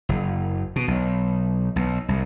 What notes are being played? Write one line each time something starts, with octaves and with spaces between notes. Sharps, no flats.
F#1
B2
B1
B1
C2